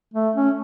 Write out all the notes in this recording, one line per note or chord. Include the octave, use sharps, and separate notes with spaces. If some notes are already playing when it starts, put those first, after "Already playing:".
A3
C#4